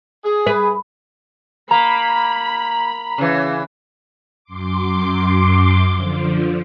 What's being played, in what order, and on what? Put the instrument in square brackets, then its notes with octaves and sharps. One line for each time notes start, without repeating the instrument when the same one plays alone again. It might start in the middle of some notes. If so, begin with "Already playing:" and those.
[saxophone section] G#4
[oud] B4
[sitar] A#3 [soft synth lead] A#5 [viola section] B5
[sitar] C#3 E3
[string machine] F#2 C6 D6
D3 F3